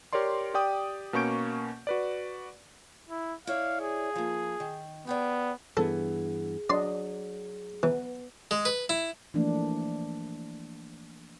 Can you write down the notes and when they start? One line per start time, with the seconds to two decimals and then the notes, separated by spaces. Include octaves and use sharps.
0.13 G4 A#4 C#5 D5 C6
0.54 G4 D5 G5 D#6
1.13 B2 A#3 C#4 C#6 G6 D7
1.87 F#4 B4 D5
3.09 E4
3.47 E4 C#5 D5 F5
3.80 G#4
4.16 F3 A#3
4.60 D#3
5.07 B3 G4 G#4 D5
5.77 G2 E3 B3 G#4 A4
6.70 F#3 D4 D5 D#5 C6
7.83 E3 B3
8.51 G#3
8.65 B4
8.89 E4
9.34 E3 F3 A3 A#3 D4